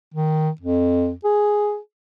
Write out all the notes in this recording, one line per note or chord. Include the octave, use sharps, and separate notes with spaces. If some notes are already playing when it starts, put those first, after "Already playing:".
D#3
F2
G#4